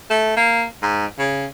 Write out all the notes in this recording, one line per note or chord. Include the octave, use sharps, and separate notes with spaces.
A3
A#3
G#2
C#3